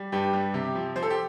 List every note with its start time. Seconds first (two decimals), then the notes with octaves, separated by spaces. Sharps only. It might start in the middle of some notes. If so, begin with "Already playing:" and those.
Already playing: G3
0.12 G2 G4
0.33 G3
0.54 C3 G4
0.75 F3
0.96 F3 C5
1.03 A4
1.10 G4